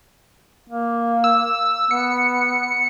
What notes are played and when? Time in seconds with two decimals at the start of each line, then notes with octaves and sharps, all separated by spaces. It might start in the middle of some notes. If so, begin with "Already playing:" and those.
0.69 A#3
1.24 E6
1.91 B3 C#7